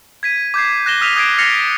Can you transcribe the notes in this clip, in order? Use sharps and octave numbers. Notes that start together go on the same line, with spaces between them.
G#6 B6 D#7
D6 G6 G#6 C7
F#6 A#6 E7 G7
D#6 F6 B6 D#7 F7
D#6 G#6 C7 D7
F6 A6 A#6 C7 C#7 F7